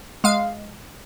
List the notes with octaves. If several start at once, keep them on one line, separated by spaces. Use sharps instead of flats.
G#3 F5